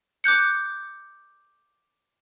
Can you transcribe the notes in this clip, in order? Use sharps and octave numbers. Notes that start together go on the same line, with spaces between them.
D6 F#6 G6 C#7